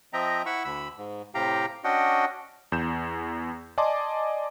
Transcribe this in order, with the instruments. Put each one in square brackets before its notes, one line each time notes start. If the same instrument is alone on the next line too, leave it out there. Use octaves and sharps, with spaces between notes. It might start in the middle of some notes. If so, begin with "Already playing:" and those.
[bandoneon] F3 C4 D#5 E5 G5 A#5
E4 F#5 B5 C#6 E6
D2 B5 E6
G#2
A2 C3 G4 F5 G5 A#5
C#4 D4 F#4 D#5 F#5 G5
[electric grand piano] E2 G6 E7
D5 D#5 G#5 A5 C6 D6